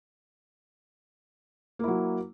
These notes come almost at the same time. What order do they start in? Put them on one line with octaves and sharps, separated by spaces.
A#3 E4 F#3